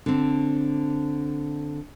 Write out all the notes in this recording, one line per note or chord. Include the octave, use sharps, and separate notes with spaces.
D3 C4